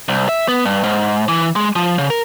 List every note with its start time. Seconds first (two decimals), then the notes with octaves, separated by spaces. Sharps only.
0.09 C2
0.29 E5
0.48 B3
0.65 G2
0.84 G#2
1.28 E3
1.56 G#3
1.76 F3
1.98 C#3
2.10 A#4